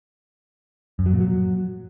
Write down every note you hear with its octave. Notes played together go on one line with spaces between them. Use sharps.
F#2
F#3
A#2
F#3